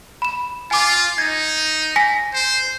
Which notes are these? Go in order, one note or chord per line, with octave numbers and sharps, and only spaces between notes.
B5 E7
F4 G#5 D6
D#4 G#6
G#5 A#6 B6
C5